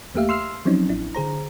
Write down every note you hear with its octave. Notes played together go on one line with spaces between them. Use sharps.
E2 A3 A#3 G4 E5 F5
C6 E6 F6 C7
F3 F#3 C4 C#4 D#4
A1 D4 E4
D3 G#4 C5 A#5